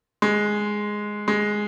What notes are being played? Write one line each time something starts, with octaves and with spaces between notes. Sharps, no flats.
G#3
G#3